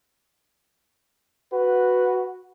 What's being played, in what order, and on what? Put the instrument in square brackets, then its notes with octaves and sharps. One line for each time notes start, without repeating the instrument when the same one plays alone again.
[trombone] F#4 [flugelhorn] B4